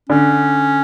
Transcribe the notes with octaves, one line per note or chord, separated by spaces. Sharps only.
D3 C#4